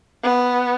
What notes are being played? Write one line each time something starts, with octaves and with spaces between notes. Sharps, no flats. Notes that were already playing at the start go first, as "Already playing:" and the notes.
B3